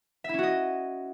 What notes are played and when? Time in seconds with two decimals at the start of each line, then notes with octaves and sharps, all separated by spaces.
0.24 E5
0.29 E4
0.34 C#4
0.38 F#4
0.43 D#5